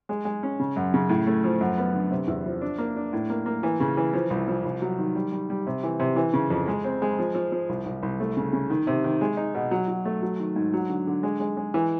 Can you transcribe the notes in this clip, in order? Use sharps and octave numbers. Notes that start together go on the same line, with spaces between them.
G#3
G#3
C#4
C#3
F#2
C#3
A2
A3
F3
F#2
B3
D3
C3
E2
F3
D4
A#3
D4
A2
A#3
A#3
E3
C#3
E3
F3
C2
F3
C2
F#3
D#3
G3
G3
G3
C3
E3
C3
E3
C#3
F2
G#3
C4
G#3
F3
F3
F3
C2
C2
C2
A3
C#3
C#3
D#3
C3
D#3
G#3
D#4
B2
F#3
F#3
A3
F#3
D#3
G#2
F#3
D3
D3
G#3
G#3
G#3
E3